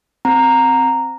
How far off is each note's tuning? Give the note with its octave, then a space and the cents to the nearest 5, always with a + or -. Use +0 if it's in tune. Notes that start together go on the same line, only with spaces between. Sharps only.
C4 +0 A#5 -5